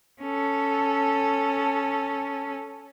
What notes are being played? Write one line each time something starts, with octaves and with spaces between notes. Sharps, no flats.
C#4 A4